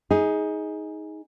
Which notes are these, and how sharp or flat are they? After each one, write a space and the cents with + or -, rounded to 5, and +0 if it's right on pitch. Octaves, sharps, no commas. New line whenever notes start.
D#4 +20 G#4 +0